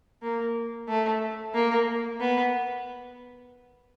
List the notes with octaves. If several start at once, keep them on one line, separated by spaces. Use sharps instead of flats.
A#3
A3
A#3
B3